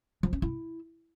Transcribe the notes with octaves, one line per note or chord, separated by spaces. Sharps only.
F3
C#4
E4